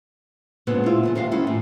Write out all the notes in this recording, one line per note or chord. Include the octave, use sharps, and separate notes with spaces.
G2 A#2 C#3 G#3 B3 C4
E4 F4
E2 E3 F3
D#2 D#3 G3 G#3 F#4 F5
D#3 C#4 E4 F4
A2